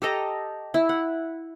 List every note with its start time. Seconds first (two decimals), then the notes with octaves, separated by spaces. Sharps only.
0.02 G4 A4 D#5 A#5
0.74 E4
0.89 F#5